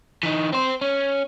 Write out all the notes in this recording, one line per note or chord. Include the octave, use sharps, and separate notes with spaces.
E3 D#4
C4 C5
C#4